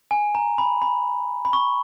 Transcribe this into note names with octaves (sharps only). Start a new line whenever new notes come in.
G#5
A#5
B5
B5
B5
C#6